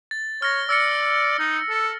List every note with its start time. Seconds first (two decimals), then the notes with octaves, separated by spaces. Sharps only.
0.11 A6
0.42 C#5 F6 A#6
0.69 D5 E6 F6 C#7
1.39 D#4
1.70 A4